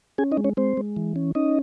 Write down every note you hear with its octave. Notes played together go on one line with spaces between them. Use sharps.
C#4 G#4 G#5
D#4 D#5
G#3
C#4 C#5
G#3 C4 C5
G#3
E3
C#4
C#4 D#4 D#5